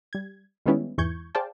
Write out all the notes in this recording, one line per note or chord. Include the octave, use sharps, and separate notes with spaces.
G3 G#6
D#3 G3 G#3 B3 C#4 E4
E2 G#2 E3 C#6 G6 G#6
G#4 C5 D5 F5 G5 A5